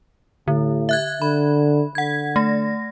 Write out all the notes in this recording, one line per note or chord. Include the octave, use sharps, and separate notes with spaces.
A2 D3
E5 F#6 G#6
D3 B5
D3 F#5 G#6
A3 A#6